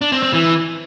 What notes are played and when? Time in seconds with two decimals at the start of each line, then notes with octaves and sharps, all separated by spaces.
0.01 D4
0.12 C4
0.23 C4
0.33 E3